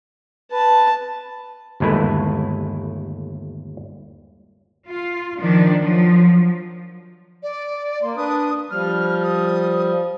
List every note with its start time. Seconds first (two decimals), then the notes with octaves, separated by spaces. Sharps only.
0.52 B4 A5
1.80 G1 D#2 G#3 A3 E4 B4
4.85 F4
5.39 D#3 F3 D4
5.80 F3 F#3
7.43 D5
8.02 A#3 C6
8.16 D4 B4 D#6
8.71 F3 G3 F6
9.24 D#6